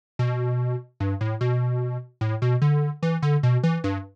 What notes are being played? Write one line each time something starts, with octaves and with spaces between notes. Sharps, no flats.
B2
G2
A2
B2
A2
B2
D3
E3
D3
B2
E3
G2